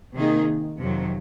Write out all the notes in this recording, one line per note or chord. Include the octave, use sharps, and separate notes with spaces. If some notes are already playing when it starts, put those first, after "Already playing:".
C3 D#3 A#3 D#4 G#4
F2 C3 D#3 F#3